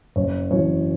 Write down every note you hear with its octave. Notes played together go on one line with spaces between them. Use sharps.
F#1 C#5
F#2 E3 C#5